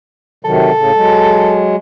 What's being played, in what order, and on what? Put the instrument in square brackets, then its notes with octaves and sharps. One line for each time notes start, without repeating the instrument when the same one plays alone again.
[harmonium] C3 D#3 F#3 [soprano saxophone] A4
[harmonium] A2 C#3
F#3 G#3